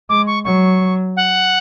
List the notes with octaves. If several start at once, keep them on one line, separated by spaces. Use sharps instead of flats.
G#3 D6
C#6
F#3 C#6
F#5